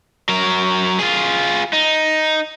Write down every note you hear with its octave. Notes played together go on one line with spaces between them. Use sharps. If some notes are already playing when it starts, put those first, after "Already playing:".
F#3 A#4
F4 G#4
D#4